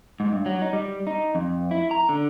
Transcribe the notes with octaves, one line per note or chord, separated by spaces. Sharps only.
G#2
G2
F#3
D#4
G3
D#4
F2
E4
A#5
D3